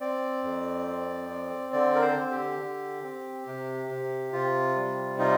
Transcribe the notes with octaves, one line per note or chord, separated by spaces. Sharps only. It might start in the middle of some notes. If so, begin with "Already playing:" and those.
C4 D5
F2
C4
C4
D3 D5
A#4
C5
D3
G4
D3
C4
C3
C3
C3 F4
G3
D#4 F4